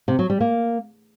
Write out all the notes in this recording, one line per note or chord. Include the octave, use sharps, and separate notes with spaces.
C3
F#3
G3
A#3